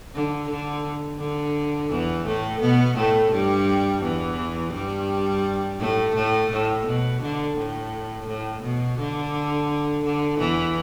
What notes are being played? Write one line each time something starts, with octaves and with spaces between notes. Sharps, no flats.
D3
D3
D3
E2 E3
A2 A3
B2 B3
A2 A3
G2 G3
E2 E3
G2 G3
A2 A3
A2 A3
A2
B2
D3
A2
A2
B2
D3
D3
E2 E3